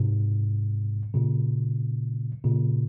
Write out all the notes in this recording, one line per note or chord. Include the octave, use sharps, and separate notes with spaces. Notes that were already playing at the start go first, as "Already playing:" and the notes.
Already playing: G#2 C3
A#2 C#3
A#2 C#3